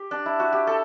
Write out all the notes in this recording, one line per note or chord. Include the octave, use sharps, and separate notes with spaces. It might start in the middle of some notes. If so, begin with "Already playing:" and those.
Already playing: G4
D4
E4
F#4
G4
A4